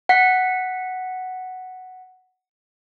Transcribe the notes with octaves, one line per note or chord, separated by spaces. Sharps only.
F#5 B6